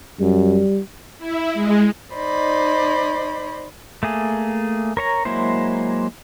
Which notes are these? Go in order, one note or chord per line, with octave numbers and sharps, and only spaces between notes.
F#2 G3
E4
G#3
D#4 C5 D5 D#5 B5
A3 A#3 G#4
A#4 C#5 A#5
F#3 G#3 A#3 E4 C5